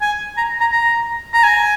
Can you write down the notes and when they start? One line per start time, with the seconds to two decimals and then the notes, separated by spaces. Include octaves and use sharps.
0.01 G#5
0.37 A#5
0.60 A#5
0.72 A#5
1.33 A#5
1.44 G#5